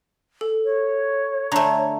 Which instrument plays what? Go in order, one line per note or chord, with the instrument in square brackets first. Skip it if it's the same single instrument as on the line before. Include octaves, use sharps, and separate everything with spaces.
[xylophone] A4
[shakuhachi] C#5
[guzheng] D3 A3 [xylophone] A#5